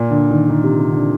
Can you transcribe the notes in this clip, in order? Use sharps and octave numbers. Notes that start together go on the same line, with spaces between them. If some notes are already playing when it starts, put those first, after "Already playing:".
Already playing: A#2
D3
D#3
D#3
C3
C3
D3